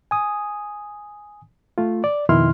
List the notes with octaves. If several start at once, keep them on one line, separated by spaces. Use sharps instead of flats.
G#5 D#6
A3 F4
D5
F2 B2 D#3 E4 C6 F6